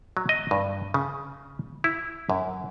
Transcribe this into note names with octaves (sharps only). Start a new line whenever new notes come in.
F#3
D#5
G2
C#3
E4
F#2